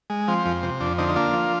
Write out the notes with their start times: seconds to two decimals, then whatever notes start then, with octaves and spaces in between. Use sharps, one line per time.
0.10 G#3
0.28 F3 C4
0.46 F2
0.63 C3
0.80 F2 D4
0.98 D3 C4 D#4
1.08 D#4
1.16 A#3 D4 F4
1.33 F3